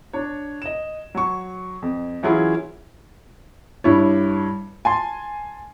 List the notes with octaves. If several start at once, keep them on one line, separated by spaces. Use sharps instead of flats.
D4 C#5
D#5 E7
F#3 C#6
F2
E3 F#3 C#4 E4 F4 G#4
G2 E4 C#5
G#5 A5 C6